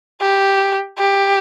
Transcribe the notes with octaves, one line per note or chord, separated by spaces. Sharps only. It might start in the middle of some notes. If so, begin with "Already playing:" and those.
G4
G4